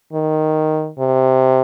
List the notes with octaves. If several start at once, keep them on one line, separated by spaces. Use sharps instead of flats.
D#3
C3